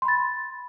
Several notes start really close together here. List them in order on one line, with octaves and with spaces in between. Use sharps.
C6 B5 A6